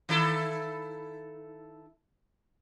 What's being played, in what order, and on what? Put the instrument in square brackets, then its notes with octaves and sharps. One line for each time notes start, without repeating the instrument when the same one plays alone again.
[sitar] D#3 E4 A4